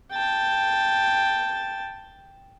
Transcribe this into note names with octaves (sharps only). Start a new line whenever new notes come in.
G5 A5